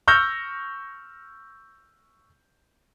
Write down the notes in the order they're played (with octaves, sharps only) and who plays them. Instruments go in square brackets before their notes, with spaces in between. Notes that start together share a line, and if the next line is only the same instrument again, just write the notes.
[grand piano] C#6 E6 F6 G6 A#6